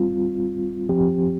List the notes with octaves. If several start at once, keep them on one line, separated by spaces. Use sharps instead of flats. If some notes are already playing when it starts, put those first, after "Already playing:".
Already playing: G3 C4 F4
F3 C4 G4